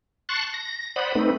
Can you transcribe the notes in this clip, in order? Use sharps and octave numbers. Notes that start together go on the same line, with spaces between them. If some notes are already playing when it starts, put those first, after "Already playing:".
A5 C6 C#6 F#6
A#6
C5 D5 F#5 B5 D#6
A3 C4 D#4 B4